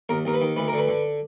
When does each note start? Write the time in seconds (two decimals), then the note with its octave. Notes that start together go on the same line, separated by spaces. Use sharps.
0.09 D#2 A#4
0.25 D#2 A#4
0.34 B4
0.41 D#3
0.56 D2 B4
0.68 D3 A#4
0.78 B4
0.88 D3